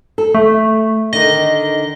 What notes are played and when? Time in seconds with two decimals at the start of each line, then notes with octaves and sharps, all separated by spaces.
0.18 A4
0.35 A3
1.13 D3 D#3 D#5